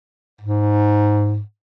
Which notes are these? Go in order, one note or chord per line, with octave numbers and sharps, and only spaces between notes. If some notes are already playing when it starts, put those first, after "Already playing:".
G#2